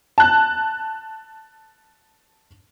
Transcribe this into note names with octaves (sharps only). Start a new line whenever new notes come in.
A5 F#6